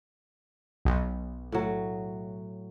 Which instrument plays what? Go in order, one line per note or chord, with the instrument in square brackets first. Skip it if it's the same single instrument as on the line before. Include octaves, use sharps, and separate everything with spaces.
[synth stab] B1
[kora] A2 F#3